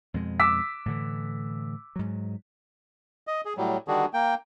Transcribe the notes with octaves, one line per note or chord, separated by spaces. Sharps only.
F2 B2 G#3
D6 E6 B6
A2 D3 E3
G#2 F#3
D#5
G#4
A2 F#3 G3
D3 D#3 G3 D4 F#4 G#4
A#3 G5